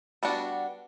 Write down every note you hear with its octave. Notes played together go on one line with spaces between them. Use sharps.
G3 B3 D4 F#4